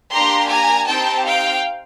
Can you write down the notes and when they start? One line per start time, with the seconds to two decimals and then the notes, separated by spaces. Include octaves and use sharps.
0.13 A#3 D4 G4 A#5 C6
0.50 G#5 A#5
0.88 C4 D#4 G4 G5 A5
1.25 F5 G5